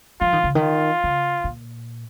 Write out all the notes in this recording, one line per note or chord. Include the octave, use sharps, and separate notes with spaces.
F3 F4
D#3
C#3
D#3
F4
C#3
A#2